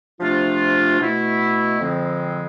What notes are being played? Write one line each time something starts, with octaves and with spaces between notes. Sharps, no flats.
C3 F3 A3 D4 F4
B2 A3 E4
F2 D3 F3 G#3 C4